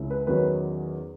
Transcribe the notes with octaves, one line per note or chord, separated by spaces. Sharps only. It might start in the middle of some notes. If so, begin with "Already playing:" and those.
Already playing: C#2 C#3 G#3 C#4 E4
B4
E2 D#3 F#3 C#4 B4